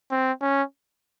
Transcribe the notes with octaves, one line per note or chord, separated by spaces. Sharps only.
C4
C#4